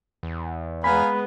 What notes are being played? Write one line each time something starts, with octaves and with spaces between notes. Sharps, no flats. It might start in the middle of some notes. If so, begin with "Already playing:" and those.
E2
G#3 B3 F5 G#5 A#5 B5